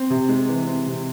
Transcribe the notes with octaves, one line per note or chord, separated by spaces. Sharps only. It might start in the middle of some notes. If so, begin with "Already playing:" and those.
Already playing: C4
C3
G#3
E3
C4
C3